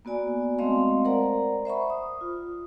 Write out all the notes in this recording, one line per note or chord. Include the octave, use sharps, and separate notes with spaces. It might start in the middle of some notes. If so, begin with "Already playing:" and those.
A#3 B3 F#4 D5 G#5
G#3 A3 C4 D#5 F5 C6
A#4 C5 D5 F#5 A#5
C5 E5 B5 C#6
D#6
F4